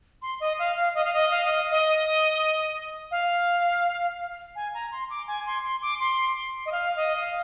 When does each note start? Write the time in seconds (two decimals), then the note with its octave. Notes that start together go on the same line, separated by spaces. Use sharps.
0.22 C6
0.40 D#5
0.59 F5
0.76 F5
0.95 D#5
1.04 F5
1.13 D#5
1.31 F5
1.45 D#5
1.71 D#5
3.11 F5
4.56 G#5
4.74 A#5
4.92 C6
5.10 D6
5.27 G#5
5.46 C6
5.64 C6
5.82 D6
6.00 C6
6.66 D#5
6.72 F5
6.96 D#5
7.21 F5